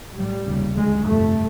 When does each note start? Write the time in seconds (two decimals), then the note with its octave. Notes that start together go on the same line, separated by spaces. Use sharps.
0.16 B1 A2 G3
0.46 F1 D#2 C#3
0.75 D2 C#3 G#3
1.05 G1 F2 C3 A3